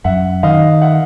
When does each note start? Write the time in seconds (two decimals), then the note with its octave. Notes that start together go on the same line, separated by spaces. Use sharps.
0.04 F#2 E5 F#5
0.43 D#3 D#5 F5
0.81 E5 F#5